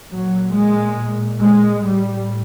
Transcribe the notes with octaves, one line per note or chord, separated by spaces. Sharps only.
A#2 F#3
G#3
G#3
A2 G3